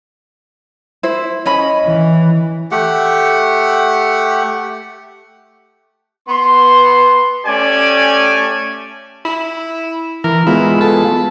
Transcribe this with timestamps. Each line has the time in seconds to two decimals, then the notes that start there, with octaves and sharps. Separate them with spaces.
1.03 E4 C5
1.46 C#4 D#5 B5
1.86 E3
2.71 A3 G4 F#5
6.28 B3 C6
7.46 A3 C#4 G4 D5 G#5
9.25 E4
10.24 E3 A#4
10.47 G#3 B3 E4 F4
10.81 A4